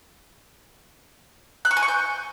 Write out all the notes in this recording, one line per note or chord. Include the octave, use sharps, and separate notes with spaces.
F#6
C#6
G#5
C#6
G6